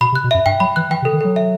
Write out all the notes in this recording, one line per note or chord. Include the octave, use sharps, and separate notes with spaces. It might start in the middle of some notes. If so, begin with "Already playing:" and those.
B2 B5
C3
F#6
B2
F#2 E5
G2 G5
F#3 B5
E3 F#6
E3 G5
C3
A4
D#3
F#3 A4
E5